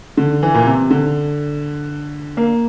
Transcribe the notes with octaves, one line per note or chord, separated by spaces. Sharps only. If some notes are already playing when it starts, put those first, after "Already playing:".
D3
E3
A#2
C3
D3
A#3